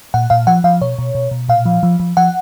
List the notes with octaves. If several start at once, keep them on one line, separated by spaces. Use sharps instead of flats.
A#2 F#5
A#2 F5
F3 F#5
F3 F5
B2 C#5
B2
B2
B2
A#2 F5
F3
F3
F3
F3 F#5